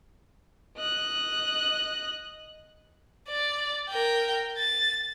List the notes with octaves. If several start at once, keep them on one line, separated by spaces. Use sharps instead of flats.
D#5 F#6
D5
A#4 G5
A6